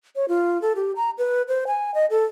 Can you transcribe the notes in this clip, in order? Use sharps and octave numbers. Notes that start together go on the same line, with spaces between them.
C#5
F4
A4
G4
A#5
B4
C5
G#5
D#5
A4